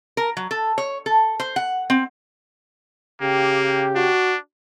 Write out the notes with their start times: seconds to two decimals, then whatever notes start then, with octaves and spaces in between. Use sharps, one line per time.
0.17 A#4
0.37 F#3
0.51 A4
0.78 C#5
1.06 A4
1.40 C5
1.56 F#5
1.90 C4
3.21 C#3 A#3 G4
3.95 D4 F#4